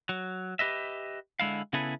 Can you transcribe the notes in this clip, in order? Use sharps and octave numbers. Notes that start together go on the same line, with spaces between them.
F#3
G4 B4 D#5 E5
D3 G#3 E4 F5
C#3 B3 E4 G#4 A4 B4